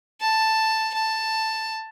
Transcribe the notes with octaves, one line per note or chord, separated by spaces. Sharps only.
A5
A5